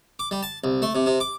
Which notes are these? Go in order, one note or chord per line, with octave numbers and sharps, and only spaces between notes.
D6
G3
A5
C2
A3
C3
C3
D6